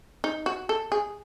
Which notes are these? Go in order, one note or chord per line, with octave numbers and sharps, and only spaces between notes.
D#4
F#4
A4
G#4